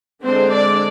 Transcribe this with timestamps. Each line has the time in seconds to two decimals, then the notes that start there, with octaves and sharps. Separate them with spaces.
0.23 D3 G#3 C4 D4 C5
0.51 D4 D5